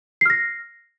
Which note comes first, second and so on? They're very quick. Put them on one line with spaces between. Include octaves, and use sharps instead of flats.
C7 F6 A#6